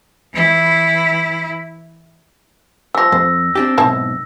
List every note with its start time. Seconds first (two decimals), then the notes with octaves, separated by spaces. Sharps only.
0.33 E3 E4
2.95 F3 G3 E6 A#6
3.12 F2 C5
3.55 C4 D4 G4
3.78 B1 G#2 C4 E4 A5